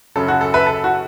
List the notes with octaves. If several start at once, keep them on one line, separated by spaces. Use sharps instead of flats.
F#2 C#3 F#3 A4
F#4
A4
B4 E5
A4
F#4